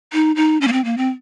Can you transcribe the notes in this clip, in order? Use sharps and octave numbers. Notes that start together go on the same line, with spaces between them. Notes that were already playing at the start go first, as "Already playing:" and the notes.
D#4
D#4
C#4
A#3
C4
A#3
C4